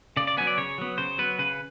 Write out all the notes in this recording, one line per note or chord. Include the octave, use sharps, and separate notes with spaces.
C#3 D5
D5
F#3 B3 G#5
D5
C#3 C#5
F#3 B3
C#3 C5
F#3 B3 B4
C#3 B4